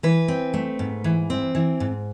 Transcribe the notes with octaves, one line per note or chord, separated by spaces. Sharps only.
E3 B4
C4
A3
G#2
E3
C4
E3
G#2